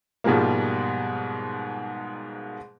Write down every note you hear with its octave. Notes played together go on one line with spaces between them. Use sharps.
G#2 B2 F3 G3 G#3 A#3